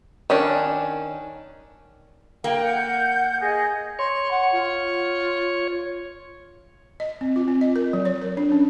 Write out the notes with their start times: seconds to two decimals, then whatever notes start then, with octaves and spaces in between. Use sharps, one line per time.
0.30 D#3 C#4 D4
2.44 A#3 G5
2.63 F#5 G6
3.40 G#4 D#5
3.99 C#5 C6
4.31 F#5
4.52 F4
7.00 D#5
7.21 C4
7.36 F4
7.48 C4
7.61 D#5
7.76 A#4
7.93 F#3
8.05 C#5
8.21 A#4
8.37 D4
8.52 C#4